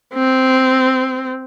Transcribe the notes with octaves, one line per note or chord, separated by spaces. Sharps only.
C4